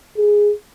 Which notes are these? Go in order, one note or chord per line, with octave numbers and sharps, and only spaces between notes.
G#4